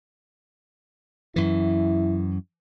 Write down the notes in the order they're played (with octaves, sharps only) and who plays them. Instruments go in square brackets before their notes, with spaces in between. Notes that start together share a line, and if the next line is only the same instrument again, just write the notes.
[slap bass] F#2 E3 [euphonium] E4